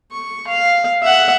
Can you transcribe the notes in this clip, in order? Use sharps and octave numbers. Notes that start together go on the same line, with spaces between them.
C#6
F5
E5 F#5